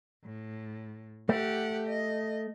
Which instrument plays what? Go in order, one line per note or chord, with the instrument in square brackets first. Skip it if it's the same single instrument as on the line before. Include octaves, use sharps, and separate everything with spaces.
[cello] A2
[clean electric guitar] A3 [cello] G4 F#5
[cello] D#5